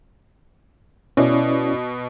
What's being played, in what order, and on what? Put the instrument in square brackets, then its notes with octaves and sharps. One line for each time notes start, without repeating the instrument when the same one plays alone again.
[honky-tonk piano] B2 [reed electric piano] C#4 E4 D5